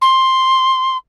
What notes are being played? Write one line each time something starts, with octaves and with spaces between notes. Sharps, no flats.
C6